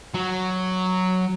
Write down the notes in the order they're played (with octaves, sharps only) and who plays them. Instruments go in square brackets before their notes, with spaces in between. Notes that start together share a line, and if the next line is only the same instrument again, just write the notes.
[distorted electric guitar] F#3